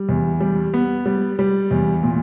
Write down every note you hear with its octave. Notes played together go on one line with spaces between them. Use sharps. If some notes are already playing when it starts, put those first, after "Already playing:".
Already playing: G3
E2
G3
B3
G3
G3
E2
A#2